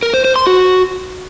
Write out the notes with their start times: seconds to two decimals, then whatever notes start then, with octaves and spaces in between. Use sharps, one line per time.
0.03 A#4
0.14 C5
0.25 C5
0.36 C6
0.47 F#4